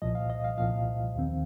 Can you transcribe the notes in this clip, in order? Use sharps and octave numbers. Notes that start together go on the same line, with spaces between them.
C2 A#2 F3 D#5
F5
D#5
F5
C2 A#2 F3 F5
D#2 D#3 C4